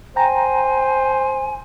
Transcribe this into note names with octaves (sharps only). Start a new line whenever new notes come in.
C5 G5 G#5 A#5